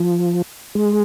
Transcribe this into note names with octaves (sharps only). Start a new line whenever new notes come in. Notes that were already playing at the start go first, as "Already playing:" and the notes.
Already playing: F3
G#3